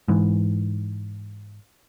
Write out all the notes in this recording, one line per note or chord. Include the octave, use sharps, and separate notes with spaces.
G#2 E3